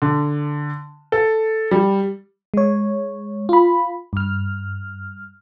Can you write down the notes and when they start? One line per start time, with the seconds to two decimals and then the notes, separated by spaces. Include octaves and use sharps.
0.02 D3
1.12 A4
1.71 G3
2.54 G#3 C#5
3.49 F4 B5
4.13 G2 F6